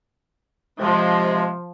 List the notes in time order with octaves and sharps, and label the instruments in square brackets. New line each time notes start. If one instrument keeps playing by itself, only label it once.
[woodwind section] C3 G#3 [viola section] F3